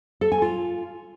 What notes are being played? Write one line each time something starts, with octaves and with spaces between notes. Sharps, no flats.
A4
G#5
F4